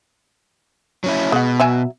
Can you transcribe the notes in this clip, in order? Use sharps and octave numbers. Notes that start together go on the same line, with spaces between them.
F#3 C#4 E4
B2 G#3 F#5
F#3 E5 G#5